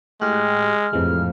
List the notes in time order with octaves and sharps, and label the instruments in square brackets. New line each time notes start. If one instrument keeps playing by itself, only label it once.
[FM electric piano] A2 G4 F#6 [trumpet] G#3 [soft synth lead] F6
[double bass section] F2 A2 F3 [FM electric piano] C3 E3 G#3